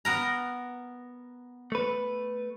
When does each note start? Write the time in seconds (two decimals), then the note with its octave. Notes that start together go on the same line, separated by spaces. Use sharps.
0.05 B3 A#4 A#5
1.72 A3 B4